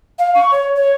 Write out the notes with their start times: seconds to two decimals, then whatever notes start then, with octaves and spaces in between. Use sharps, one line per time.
0.18 F5
0.34 C#6
0.51 C#5
0.75 C#5